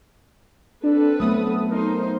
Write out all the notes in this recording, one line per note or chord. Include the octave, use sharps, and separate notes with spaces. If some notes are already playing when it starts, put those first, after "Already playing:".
C4 D4 A4 B4
F#3 A3 B3 D#6
D#4 A#4 C5